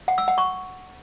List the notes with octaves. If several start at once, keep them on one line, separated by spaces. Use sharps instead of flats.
F#5
E6
F#5
C#6